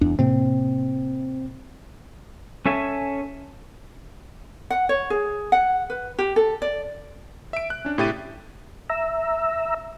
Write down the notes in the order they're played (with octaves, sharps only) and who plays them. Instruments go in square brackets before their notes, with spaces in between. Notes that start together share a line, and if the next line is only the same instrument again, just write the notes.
[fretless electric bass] D#1 E2 D4
[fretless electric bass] A2 C3 A#3 [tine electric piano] C4
[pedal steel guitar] C#4 A4 E5 G#5
[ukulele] F#5
C#5
G#4
F#5
B4
G4
A4
D5
[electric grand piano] E5 D7
F#6
C#4 D4
A2 C3 G4 E5 A6 D#7
[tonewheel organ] E5 A#5 E6